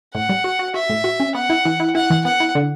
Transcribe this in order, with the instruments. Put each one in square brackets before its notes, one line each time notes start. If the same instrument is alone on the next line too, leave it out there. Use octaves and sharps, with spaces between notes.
[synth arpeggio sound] A2 [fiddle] F#5
[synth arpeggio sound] G3
F#4
F#4
[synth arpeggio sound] F#4 [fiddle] E5
[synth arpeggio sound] A2
F#4
C#4
[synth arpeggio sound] B3 [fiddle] F#5
[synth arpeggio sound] E4
E3
E4
[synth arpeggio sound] E4 [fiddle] F#5
[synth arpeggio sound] E3
[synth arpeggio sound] B3 [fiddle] F#5
[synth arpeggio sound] E4
D3